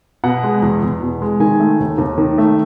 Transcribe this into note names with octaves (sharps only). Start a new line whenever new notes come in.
B2 F#5
G#3
E2
E2
B2
G#3
D#3 G#5
A3
D#2
D#2
D#3
A3